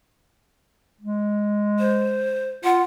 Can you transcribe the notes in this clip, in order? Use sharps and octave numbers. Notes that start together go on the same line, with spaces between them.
G#3
C5
F4 F#5